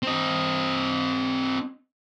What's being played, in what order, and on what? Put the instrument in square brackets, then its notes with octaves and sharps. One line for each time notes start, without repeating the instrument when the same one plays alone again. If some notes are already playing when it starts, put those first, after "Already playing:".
[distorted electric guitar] C4 D#5